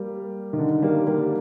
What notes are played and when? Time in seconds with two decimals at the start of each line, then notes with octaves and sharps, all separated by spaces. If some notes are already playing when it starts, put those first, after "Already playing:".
Already playing: G3 A#3
0.53 D#3
0.59 D3
0.82 G3 A#3
1.06 G3 A#3